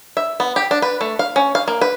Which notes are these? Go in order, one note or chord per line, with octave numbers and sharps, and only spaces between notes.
E5
B3
G4
D4
B4
A3
F5
C#4
F5
A#3
B4